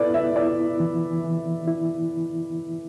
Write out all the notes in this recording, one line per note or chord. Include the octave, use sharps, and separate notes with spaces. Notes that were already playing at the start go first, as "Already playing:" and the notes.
Already playing: B3 E4 A4 B4 D5
E5
E4 D5
E3
E3
E4